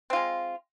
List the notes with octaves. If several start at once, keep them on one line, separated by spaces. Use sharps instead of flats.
G#3 C4 F4